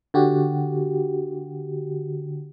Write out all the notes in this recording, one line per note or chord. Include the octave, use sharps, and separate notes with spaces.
D3 F#4 G4